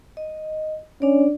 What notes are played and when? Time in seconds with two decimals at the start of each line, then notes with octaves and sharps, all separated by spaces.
0.17 D#5
1.02 C#4 D4 D5